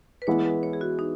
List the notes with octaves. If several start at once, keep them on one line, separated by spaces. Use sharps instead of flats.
B4
E3 G#3 B3 E4 C#5
B4
C#5
G#4
F#4
D#4